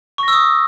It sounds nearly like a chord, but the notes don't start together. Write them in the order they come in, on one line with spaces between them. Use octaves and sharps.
C#6 A#6 E6 D#6